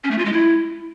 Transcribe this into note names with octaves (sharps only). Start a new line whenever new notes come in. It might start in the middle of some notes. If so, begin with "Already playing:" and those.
C#4
A3
F4
G#3
E4